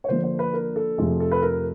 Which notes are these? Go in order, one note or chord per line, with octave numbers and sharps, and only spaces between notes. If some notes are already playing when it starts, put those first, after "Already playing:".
C#5
D3 F3 A#3 D4 C5
C5
B4
A#4
A4
F2 C3 F3 A3 G#4
A4
B4
A#4